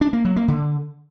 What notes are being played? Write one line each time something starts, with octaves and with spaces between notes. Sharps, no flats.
D4
A#3
F#3
A#3
D3